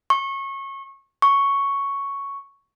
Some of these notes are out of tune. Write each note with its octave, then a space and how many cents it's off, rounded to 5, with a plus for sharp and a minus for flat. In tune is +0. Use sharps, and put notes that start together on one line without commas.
C#6 -25
C#6 +0